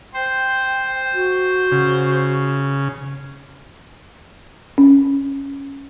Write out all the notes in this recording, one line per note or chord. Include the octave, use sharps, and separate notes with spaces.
C5 G5
F#4
C#3
C#4